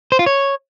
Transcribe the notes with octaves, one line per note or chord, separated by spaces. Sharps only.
C5
F4
C#5